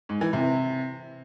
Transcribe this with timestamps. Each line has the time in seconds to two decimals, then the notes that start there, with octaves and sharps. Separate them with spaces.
0.09 G#2
0.21 E3
0.33 C3